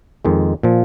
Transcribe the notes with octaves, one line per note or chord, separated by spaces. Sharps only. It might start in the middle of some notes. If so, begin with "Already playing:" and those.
F2 D#3 G#3
A#2 F3